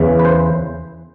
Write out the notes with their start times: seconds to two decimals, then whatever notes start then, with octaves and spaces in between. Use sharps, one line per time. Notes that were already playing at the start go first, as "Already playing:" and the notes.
Already playing: E2 C#3 E3
0.19 B4
0.25 C5